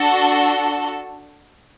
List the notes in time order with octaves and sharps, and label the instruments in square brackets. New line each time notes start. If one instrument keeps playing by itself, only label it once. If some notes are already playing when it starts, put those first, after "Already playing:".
Already playing: [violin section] D4 F#4 A4